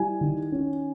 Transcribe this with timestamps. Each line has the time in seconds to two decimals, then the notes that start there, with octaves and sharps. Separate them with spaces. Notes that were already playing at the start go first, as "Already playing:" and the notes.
Already playing: G3 E4 G#5
0.21 D#3
0.52 C#4